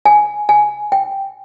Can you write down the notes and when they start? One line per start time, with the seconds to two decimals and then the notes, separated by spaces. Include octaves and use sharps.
0.06 G#5
0.49 G#5
0.92 G5